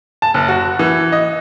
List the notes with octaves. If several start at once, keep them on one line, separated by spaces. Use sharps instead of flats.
A5
F#1
F#4
E3
D#5